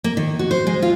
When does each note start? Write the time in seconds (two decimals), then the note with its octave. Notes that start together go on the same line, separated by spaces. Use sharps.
0.04 A#3
0.17 D#3
0.39 F#4
0.51 C5
0.67 G#3
0.82 F4